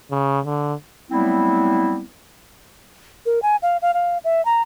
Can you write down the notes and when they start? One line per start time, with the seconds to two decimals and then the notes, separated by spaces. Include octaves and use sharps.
0.11 C#3
0.45 D3
1.11 F#3 G3 A3 B3 C4 E4
3.26 A#4
3.42 G#5
3.62 F5
3.82 F5
3.94 F5
4.24 E5
4.45 A#5